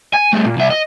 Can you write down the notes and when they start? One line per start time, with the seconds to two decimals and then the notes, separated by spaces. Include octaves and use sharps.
0.14 G#5
0.33 G3 A3
0.45 A#2
0.57 C2 E5
0.70 D#5